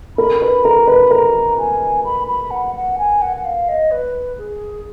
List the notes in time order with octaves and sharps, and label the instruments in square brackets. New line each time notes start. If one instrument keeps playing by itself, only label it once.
[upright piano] A#4 [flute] B5
[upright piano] B4 [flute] B5
[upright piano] A#4 [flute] A#5
[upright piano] B4 [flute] B5
[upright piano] A#4 [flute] A#5
[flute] G#5
B5
B5
F#5
F#5
G#5
F#5
F#5
F5
D#5
B4
G#4